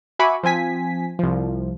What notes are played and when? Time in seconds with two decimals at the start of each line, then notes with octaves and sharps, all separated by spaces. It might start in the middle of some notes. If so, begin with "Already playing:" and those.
0.19 F#4 E5 G#5 B5 C#6 D6
0.43 F3 C4 G#5 B6
1.19 C2 F3